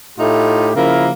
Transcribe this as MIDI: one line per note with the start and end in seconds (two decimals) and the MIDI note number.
0.19 0.71 45
0.19 0.71 57
0.19 0.71 63
0.19 0.71 65
0.19 0.71 67
0.76 1.11 49
0.76 1.11 53
0.76 1.11 58
0.76 1.11 64
0.76 1.11 70